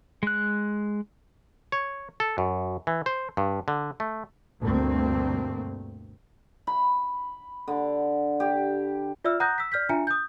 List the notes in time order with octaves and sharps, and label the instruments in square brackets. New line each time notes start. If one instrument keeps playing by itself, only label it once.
[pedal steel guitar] G#3 F#6
[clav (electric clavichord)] C#5
A4
F#2
E3
C5
G2
D3
A3
[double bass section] D2 G2 B2 A3 A#3 C4
[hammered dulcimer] B5
D3
G4
[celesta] F4 D5 E5 E6 F6
F#5 A#5 D#6 F#6 G6 A#6
E6 B6
D5 F6 G6 B6
D4 F4 E5 G#5 A#5 C#7
D#6 G6